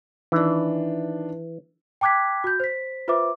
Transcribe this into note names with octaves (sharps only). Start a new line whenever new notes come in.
D#3 E3 D4
G5 A5 D6 F#6 G#6 B6
F#4 G6
C5 B6
F4 B4 C5 E5 D6